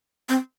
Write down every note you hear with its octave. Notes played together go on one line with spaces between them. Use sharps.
C4